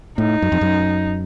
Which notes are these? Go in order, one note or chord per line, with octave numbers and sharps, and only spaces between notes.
A2 D#4
F#2
F2
F#2